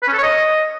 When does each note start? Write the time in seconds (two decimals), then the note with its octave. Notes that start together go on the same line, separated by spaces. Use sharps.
0.02 B4
0.08 C#4
0.13 A4
0.18 C#5
0.23 D#5